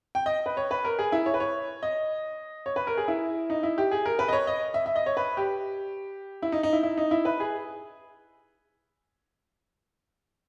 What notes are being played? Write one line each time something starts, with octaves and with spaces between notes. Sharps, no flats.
G5
D#5
B4
C#5
B4
A#4
G#4
E4
C#5
B4
C#5
D#5
C#5
B4
A#4
G#4
E4
D#4
E4
G4
G#4
A#4
B4
D#5
C#5
D#5
E5
E5
D#5
C#5
B4
G4
E4
D#4
D#4
E4
E4
D#4
E4
B4
G#4